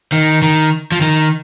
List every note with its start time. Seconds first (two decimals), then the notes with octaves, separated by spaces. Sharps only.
0.12 D#3
0.42 D#3
0.92 F3
1.01 D#3